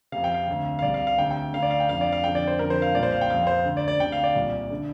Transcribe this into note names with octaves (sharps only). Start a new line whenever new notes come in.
F2 C3 F5
G5
F5
D2 C3
F5
C2 C3 D5
F5
F5
D2 C3 G5
G5
D2 D3 F5
D5
F5
G5
F2 D3 F5
D5
F5
F2 D3 G5
D5
C5
F2 D3 A#4
C5
F5
C2 A#2 D5
C5
F5
G5
F2 C3 F5
C5
D2 D3
D5
D5
D2 C3 G5
F5
D5
C2 A#2
D3